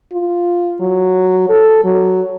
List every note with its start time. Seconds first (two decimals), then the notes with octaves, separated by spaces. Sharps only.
0.13 F4
0.80 F#3
1.49 A4
1.84 F#3